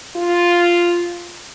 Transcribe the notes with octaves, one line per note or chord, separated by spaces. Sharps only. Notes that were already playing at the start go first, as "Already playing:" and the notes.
F4